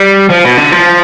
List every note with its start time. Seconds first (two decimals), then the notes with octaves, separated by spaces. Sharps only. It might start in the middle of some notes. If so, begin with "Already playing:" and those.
Already playing: G3
0.30 F3
0.44 B2
0.57 D3
0.72 F3